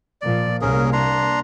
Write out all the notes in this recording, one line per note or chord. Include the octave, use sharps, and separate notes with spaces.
A#2 F3 D5
C2 A#3 C#4 G#4 A#4
D4 A#5 C6